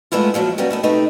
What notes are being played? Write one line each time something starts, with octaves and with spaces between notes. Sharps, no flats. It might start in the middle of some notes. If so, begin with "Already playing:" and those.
G#3 A3 B3 E4 F4
D#2 F3 F#3 F5
F#3 G3 A#3 B3 C#4 F#4
A3 D#4 E4
C3 A3 D#4 G4 B4